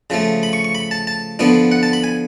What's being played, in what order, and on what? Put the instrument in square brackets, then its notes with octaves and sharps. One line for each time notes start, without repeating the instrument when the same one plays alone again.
[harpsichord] C#3 F3 A3
B5
C#6
C#6
B5
A5
A5
D3 F3 B3 D4
F#5
A5
B5
G#5